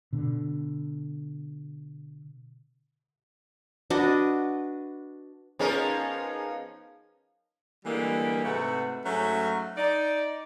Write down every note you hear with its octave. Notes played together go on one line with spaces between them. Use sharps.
B2 D3
D4 F#4 B4 D#5
F3 B3 C#4 D#4 G#4 A#4
D3 E3 G3 G#3 A#3
G#2 C3 A3 F#4 B4 F#5
G#2 F#3 A3 C#4
D#4 D5